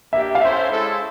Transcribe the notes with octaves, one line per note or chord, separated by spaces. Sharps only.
A#3 D4 G4 E5
F5
C#4 E4 A4 C5 E5
G#3 C#4 E4 A4